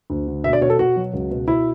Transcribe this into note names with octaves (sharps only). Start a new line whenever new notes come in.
D2
D3
B2 E5
D5
B2 C#5
A4
B2 F#4
F#3
C#2
B2
B2 E4